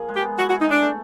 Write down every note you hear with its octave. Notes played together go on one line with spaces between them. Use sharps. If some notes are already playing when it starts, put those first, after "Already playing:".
Already playing: F3 A#3 G#4
G#3
G4
B3
E4 F#4
F#4
G#4
D#4
G#3 D4
A3